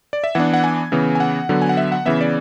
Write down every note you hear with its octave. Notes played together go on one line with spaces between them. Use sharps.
D5
E5
E3 B3 D4 F#5
F#5
G#5
C#3 E3 B3
G#5
F#5
D3 F#3 B3
G#5
F#5
E5
F#5
C#3 E3 B3 E5
D5